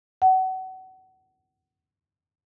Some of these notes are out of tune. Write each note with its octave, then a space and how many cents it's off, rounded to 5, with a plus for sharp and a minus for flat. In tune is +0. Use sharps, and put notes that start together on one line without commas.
F#5 +30